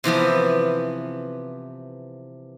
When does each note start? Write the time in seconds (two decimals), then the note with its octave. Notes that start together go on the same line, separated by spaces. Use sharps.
0.04 C3 E3 F3 B3